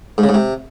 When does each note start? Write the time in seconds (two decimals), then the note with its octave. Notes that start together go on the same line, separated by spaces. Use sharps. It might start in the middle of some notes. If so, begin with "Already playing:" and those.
0.18 G#2
0.23 C#3
0.29 G#2
0.34 C3